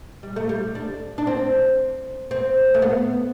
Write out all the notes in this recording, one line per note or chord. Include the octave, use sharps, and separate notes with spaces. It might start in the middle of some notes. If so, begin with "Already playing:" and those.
G3
A3
G3
D4
D4
C4
C4
A3
B3